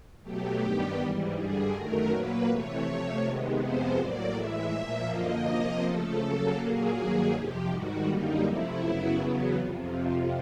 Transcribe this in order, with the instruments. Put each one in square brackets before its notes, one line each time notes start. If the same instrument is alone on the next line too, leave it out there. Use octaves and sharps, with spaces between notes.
[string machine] B2 F#3 A3 G4
G2 D#3 G3 B3
G#2 E3 G3
G2 D3 G3 G#4
F#2 D#3 F#3 A3 A#4
A#2 F#3 A#3 B4
C3 E3 A3 C#5
C3 F3 A3
C3 D#3 G#3 B3
F2 C3 F3 G#3 B3 C5
A2 F#3 A#3 D5
A2 E3 G#3 E5
A#2 F3 A#3
F#2 D3 F3 A#3 D#5
C3 F3 A#3
C#3 F3 A3 A4
C#3 F#3 A#3
A#2 F#3 A#3 G#4
G2 D#3 F#3 A#3
F2 C3 F3 G4
G#2 D#3 G3 F#4
F#2 D3 G3 A#3 D#4
C3 F3 A3 E4
F#2 C#3 F#3 B3
E2 C#3 F#3 B3
F2 C3 F3